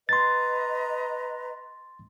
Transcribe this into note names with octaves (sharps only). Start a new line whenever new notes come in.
B4 D#5 A#5 C6 A6